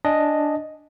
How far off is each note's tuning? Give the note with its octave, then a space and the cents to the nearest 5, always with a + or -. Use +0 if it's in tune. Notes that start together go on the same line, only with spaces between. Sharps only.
D4 +0 D#5 +0 G#5 +0